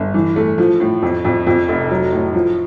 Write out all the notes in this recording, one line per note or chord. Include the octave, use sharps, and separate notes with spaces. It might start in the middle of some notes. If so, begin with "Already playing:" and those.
Already playing: G1
E3
A3
F3
A2
F2
F2
F2
F1
F#3
A2
F3